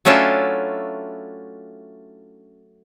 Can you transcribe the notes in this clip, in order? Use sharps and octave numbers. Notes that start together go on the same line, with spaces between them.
F#3 A3 C#4 D4 E4 F4